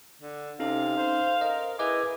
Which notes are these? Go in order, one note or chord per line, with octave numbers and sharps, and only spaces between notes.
D3
C3 C#4 D#4 A4 F5
C5
A#4 D#5
E4 G#4 B4 D#5 D6